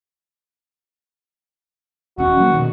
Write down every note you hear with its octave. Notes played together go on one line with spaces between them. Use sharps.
D#1 C#4 F#4
F#3 A#3
B2 D#3